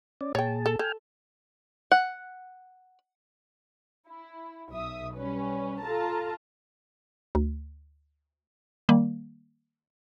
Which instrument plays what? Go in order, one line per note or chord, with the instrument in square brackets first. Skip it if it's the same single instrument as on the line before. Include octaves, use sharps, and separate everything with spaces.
[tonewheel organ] C#4 D5
[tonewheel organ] A#2 G#4 A5 [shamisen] C#5 G5
[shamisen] A4
[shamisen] A4 [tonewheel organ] G5 G#5 F6
[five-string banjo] F#5
[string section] E4
B1 E5 D#6
G3 C#4 B4
F4 A4 A5 A#5
[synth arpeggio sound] D2
D#3 G3 A#3